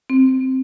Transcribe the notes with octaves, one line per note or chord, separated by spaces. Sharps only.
C4